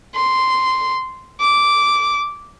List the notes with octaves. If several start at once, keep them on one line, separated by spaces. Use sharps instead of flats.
C6
D6